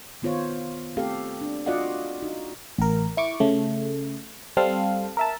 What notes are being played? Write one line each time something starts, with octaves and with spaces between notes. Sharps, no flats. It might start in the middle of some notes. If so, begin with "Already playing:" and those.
D#3 B3 F4 C5 C#5
A3 C4 G4 A4 F5
D4
F4 F#4 D5 D#5 F5 F#5
D#4 F#4
A1 A#4
E4 C#6 D6
C#3 A3
G3 C4 A4 F5
A#4 E5 A5